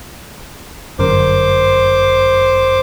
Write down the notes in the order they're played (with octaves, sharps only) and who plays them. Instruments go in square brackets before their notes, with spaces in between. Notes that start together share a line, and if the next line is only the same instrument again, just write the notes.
[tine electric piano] G1 F#2 A#4 [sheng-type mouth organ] C5 D6